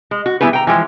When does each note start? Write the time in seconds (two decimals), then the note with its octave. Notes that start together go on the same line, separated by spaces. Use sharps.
0.11 G#3
0.26 F#4
0.41 E3 G3 B3 E4 G#4 B4
0.53 G5 A#5
0.67 E3 F3 G#3